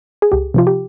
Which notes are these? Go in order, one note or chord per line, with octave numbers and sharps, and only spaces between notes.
G#4
C#2 G4
C3 F3 F4
G4